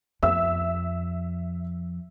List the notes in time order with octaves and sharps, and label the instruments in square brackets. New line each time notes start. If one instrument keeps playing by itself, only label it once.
[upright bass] F2 [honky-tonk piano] E5 E6